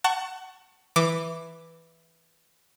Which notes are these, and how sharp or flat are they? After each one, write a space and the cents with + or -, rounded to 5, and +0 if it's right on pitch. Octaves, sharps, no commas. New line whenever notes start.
F#5 +25 A5 +20 C#6 +0
E3 +0 D6 +0